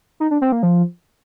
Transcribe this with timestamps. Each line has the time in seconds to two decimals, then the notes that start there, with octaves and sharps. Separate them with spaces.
0.20 D#4
0.31 D4
0.41 C4
0.52 A#3
0.63 F3